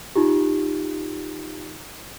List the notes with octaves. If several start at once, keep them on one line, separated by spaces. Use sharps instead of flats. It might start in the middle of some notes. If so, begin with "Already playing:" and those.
D#4 F4 G4